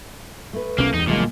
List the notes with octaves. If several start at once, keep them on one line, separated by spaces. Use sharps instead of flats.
A3 B4
B1 B2 A#3 C#4
E2 G2 D#4
A1 A#2 C#3 F3 F#3 G#3 A#3